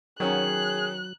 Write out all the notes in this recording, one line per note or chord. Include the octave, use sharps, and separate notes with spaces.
D#3 F#3 C#4 G#4 F#6